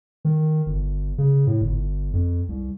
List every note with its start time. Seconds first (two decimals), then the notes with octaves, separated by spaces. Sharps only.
0.25 D#3
0.66 G1
1.18 C#3
1.47 A2
1.61 G1
2.13 F2
2.49 C2